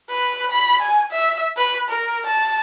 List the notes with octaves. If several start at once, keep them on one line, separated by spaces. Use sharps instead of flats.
B4
B5
G#5
E5
B4
A#4
A5